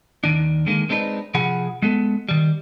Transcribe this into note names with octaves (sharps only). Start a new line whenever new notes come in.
D#2 D#3 D4
D3 D#3 G#3 A#3
G#3 C4 D4 D#4 B4
C3 F3 G#4 F#5 B5
G#3 B3 A4
D#3 G3